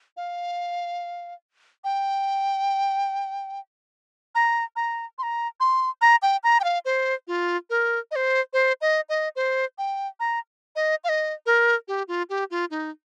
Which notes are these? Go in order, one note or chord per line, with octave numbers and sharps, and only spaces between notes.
F5
G5
A#5
A#5
C6
A#5
C6
A#5
G5
A#5
G5
F5
C5
F4
A#4
D#5
C5
C5
D#5
D#5
C5
G5
A#5
D#5
F5
D#5
A#4
G4
F4
G4
F4
D#4